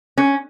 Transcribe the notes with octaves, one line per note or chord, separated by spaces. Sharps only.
C#4